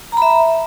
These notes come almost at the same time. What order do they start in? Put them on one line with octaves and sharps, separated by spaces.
A#5 B5 E5